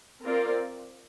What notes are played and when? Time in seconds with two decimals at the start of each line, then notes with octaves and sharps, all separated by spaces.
0.23 C4 F4 A#4 D5